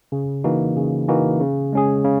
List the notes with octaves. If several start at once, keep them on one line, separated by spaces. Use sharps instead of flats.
C#3
E3 A#3 D#4 F#4
C#3
E3 A#3 D#4 F#4
C#3
G#3 C#4 G#4
C#3